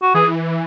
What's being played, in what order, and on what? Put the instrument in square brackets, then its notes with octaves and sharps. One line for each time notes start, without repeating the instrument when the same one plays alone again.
[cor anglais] F#4
[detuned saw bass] E3 [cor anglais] G#4